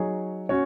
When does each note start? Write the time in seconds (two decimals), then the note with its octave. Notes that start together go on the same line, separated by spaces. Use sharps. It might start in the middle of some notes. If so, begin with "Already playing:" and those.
Already playing: F#3 D#4 G#4 C#5
0.49 C#4 F#4 C#5